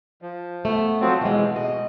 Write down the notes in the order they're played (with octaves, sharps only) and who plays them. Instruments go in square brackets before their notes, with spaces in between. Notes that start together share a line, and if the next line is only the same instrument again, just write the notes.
[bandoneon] F3
[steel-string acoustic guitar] A3 B3
[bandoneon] F3 F#3 C4
[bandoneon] B2 [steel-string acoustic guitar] E3 G#3
[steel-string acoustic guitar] D#5